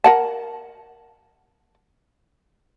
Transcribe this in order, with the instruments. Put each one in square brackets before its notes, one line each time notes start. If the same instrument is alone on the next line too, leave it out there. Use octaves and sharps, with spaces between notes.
[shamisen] A#4 F#5 A5